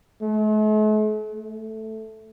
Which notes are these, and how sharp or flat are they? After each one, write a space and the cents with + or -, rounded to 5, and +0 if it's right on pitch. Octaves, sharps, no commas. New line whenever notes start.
A3 -45
A3 +0